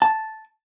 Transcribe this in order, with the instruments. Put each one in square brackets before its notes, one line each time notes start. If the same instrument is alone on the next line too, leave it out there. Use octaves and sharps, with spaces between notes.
[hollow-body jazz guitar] A5